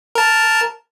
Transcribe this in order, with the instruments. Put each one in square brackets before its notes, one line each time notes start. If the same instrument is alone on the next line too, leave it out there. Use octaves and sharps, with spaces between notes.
[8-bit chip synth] A#4 A5